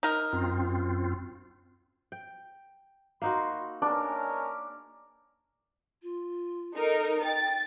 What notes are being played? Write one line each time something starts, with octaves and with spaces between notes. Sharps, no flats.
D#4 A#4
F#2 C4 F4
G5
A#3 D#4 F#4 B5 C6
G#3 C#4 D4 A#4
F4
D#4 A4 A#4
G5 A6